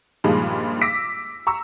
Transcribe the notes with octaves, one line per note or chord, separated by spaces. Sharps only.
G2 A#2 D#3 F3 G#3
D6 E6 A#6 B6 D7
A#5 C#6 E6